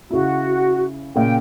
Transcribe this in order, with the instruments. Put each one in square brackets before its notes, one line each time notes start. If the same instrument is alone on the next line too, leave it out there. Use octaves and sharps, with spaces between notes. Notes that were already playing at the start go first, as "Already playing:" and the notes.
[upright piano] C#3 E4 [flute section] F#4
[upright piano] A#2 C#3 [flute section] G5